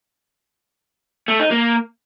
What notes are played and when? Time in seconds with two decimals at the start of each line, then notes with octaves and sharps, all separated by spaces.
1.28 A3
1.40 D#4
1.51 A#3